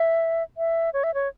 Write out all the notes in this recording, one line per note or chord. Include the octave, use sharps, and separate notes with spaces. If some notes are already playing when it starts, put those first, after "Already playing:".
Already playing: E5
E5
C#5
E5
C#5